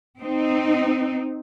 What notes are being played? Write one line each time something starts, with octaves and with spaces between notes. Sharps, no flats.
C4 D#4